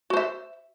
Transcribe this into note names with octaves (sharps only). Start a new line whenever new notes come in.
F#4 C5 E5